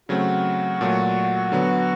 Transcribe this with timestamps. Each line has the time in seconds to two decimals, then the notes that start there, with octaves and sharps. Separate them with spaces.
0.09 C#3 F#3 A3 C4 F#4
0.81 A#2 F#3 A3
1.52 D3 F#3 B3